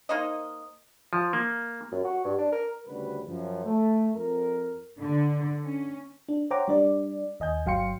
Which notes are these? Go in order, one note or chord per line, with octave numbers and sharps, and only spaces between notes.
A#3 D#4 C5 D#5
F3
A#3
F#2
F#4
G2
D4
A#4
D2 C#3 G3 F#4 B4
F#2 F3
A3
F2 A#4
D3
C#4
D4
C5 C#5 F#5 G5 A#5 D6
G3 D4 D5
D#2 D#5 G#5 G6
G1 F#3 F5 G5 C6 C#7